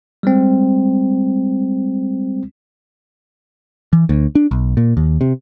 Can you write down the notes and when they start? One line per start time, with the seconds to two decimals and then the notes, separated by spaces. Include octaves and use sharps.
0.23 G3 G#3 C4
3.93 E3
4.09 D2
4.35 D4
4.51 B1
4.77 A#2
4.97 D#2
5.21 C3